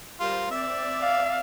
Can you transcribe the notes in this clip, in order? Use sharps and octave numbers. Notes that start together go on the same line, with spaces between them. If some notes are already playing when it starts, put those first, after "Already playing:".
G3 F4 A#4 C5
C4 D5 E5
F5